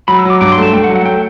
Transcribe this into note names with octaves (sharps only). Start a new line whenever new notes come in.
F#3 B5
E6
F#3 D6
G2 D6
C6
A3 A5
A3 G5
F#5
F#3
F#5
A3 G5